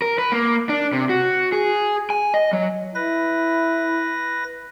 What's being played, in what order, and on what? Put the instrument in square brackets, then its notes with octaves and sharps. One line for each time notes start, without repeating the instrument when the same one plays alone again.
[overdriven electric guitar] A#4
B4
A#3
D4
C3
F#4
G#4
G#5
D#5
F#3
[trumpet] E4 [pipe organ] B4 A#6